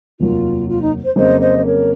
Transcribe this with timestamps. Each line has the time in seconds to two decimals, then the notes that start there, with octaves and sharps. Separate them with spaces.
0.20 F1 D#2 D#3 F#3 A#3 F4
0.67 F4
0.79 D#4
1.03 C5
1.16 F2 C#3 F#3 A#3 C5 D#5
1.40 C5 D#5
1.58 C5
1.64 A#4 C#5